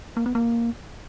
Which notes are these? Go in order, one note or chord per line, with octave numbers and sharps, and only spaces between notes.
A#3
B3
A#3